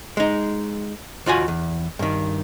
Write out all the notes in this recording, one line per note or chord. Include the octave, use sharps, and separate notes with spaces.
G#3 D#4
D#2 F4 F#4 G#5
E2
G2 D#3